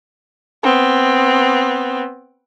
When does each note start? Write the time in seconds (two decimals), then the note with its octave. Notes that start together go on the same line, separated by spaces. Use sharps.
0.64 B3 C4